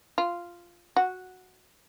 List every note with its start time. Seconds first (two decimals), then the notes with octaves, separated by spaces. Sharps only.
0.18 F4
0.97 F#4